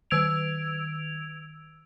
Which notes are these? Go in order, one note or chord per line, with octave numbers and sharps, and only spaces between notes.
D#3 E6 G#6 D7 F7